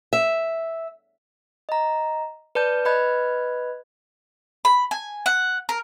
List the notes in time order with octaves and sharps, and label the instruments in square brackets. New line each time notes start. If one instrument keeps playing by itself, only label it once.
[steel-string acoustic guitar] E5
[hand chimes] D#5 A#5
B4 D5 A5 G6
B4 D#5 B5 F#6 G#6
[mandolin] B5
G#5
F#5
A#4